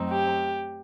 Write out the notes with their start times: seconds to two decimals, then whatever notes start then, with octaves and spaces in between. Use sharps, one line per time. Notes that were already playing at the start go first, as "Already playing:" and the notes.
Already playing: F#2 F#3 A3 C4 D#4
0.09 G4